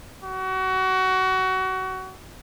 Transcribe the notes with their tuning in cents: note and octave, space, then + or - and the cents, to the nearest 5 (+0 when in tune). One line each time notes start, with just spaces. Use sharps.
F#4 +25